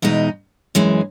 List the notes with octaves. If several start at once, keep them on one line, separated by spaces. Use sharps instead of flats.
E2 B2 G#3 D#4
F#2 E3 G#3